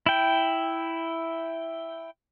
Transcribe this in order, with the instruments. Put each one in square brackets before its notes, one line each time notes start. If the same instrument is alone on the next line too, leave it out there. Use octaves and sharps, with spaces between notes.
[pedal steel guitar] E4 G5